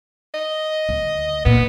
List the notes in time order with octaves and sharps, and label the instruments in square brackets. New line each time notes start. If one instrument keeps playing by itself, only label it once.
[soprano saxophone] D#5
[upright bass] D2
[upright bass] G1 A#2 [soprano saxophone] B3